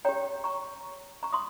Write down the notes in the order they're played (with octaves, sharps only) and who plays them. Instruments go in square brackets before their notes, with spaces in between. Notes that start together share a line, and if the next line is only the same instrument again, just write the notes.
[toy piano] G4 C#5 G5 A#5
A#5 C#6
A#5 C#6
C6 D#6